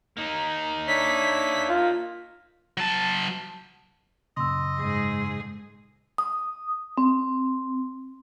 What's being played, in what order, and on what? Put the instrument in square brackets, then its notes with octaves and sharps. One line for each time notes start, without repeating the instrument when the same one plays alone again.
[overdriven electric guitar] A#3 D#4
[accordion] D4 C#5 E5 [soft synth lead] B6
[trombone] F4
[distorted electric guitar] F#3 A5
[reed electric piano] F#2 A#2 C#3 [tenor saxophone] D#5 [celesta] C6 E6
[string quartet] G#2 G#4
[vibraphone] D#6
C4